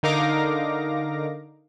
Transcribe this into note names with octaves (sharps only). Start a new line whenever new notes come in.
D3 D#4 A#4 F5 D6 A#6